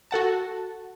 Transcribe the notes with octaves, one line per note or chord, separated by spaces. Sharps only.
F#4 A4 F#5 A5